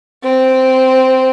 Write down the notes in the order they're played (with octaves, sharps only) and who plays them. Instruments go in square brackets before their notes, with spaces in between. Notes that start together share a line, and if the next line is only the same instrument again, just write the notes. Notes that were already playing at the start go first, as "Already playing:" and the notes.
[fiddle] C4